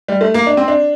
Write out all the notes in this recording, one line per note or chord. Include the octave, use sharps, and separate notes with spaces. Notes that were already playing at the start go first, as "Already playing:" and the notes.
G3
A3
A#3
D4
C4
D4